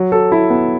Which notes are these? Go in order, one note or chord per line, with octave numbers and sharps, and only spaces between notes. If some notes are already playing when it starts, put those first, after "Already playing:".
Already playing: F#3
A4
E4
B3